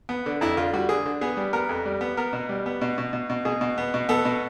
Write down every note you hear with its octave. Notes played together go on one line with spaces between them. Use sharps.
B3
D3
F2 E4
D3 F4
G3 F#4
D3 G#4
D3
B3 G#4
G3
B3 A#4
F2
G3
B3
B3 A#4
B2
G3
B3
B2
B2
B2
B2
B2 G#4
B2
B3
B2
B3 A4
B2